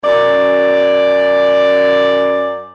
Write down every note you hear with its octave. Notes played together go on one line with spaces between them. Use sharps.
F#2 D5